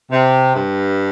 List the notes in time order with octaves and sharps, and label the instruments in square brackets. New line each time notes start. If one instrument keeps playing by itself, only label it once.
[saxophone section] C3
G2